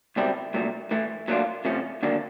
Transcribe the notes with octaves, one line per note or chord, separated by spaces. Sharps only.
C#2 B2 G3 C4 E4
C2 A#2 F#3 A3
A2 E3 A3
A#2 F#3 A3 D4 F4
C3 F3 A3 C#4
D#2 D3 F#3 A#3 D4